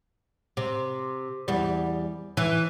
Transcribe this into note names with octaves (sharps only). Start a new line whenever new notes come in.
C3
E2 G3
E3